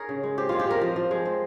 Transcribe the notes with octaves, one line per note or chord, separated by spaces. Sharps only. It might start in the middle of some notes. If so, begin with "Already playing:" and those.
Already playing: D#4 G#4 A#4 C#5
C#3
G#3
C4 G4
G#3 F4
G4
C4 A#4
F3
F3
G#3
C4